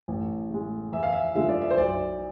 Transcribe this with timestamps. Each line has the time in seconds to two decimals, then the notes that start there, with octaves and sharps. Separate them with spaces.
0.08 A1
0.50 A2 G#3
0.92 E2 E5
1.03 F5
1.13 E5
1.35 D3 F3 G#3 E5
1.49 D5
1.62 E5
1.70 C5
1.77 B1 D5